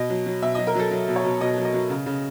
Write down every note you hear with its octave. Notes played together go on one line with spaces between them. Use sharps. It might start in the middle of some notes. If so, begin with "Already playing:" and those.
Already playing: B2 D#5
F#3
F#3
B2 E5
F#3 D#5
A#4
F#3 A4
F#3
B2
C#5
B2
B2 D#5
F#3
D#5
F#3
C#3
C#3